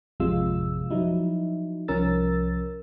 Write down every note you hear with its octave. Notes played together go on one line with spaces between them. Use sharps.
A1 F2 C3 G#3 F4 E6
F3 F#3 D#4 E4
C2 F3 C#4 A#4 E6 A6